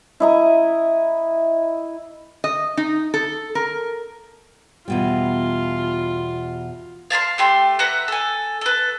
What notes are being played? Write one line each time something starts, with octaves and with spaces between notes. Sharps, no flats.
E4 D#5 A#5
D#5
D#4
A4
A#4
E2 B2 G3 F4
F5 A5 B5 C6
A3 G4 C6
B4 E5 F#5 A#5
A4 G#5
A4 B4